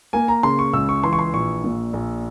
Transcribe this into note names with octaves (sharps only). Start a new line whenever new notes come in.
A#3 G#5
A#5
C#3 C6
C#6
C#2 E6
C#6
E3 C6
C#6
C6
A#1 C#6
A#2
A#1